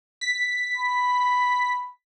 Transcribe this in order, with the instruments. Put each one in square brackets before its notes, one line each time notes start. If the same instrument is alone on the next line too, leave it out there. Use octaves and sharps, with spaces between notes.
[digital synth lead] B6
[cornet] B5